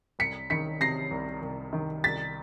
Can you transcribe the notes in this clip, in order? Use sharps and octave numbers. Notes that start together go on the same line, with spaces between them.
C2 B6 C#7
D#3 B6 C#7
C3 A#6 C7
C2
C2
D#3
C2 A6 B6